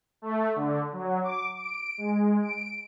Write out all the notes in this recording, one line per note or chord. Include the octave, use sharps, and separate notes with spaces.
A3
D3
F#3
D6
D7
G#3
D7